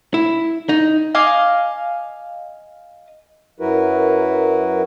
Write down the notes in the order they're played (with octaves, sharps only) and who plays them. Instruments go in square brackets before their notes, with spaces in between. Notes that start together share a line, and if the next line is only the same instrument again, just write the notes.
[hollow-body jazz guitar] E4
D#4
[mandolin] D#5 F5 G#5 D6
[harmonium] F#2 F#3 E4 F#4 A#4 B4